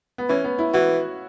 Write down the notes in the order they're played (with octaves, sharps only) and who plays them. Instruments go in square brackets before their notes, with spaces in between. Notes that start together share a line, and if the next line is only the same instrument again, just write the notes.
[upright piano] B3
[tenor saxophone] E3 [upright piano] C#4
[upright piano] B3
E4
[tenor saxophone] E3 [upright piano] F#4